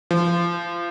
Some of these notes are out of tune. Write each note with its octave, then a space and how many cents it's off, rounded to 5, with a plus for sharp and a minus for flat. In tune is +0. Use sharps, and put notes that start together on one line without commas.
F3 -25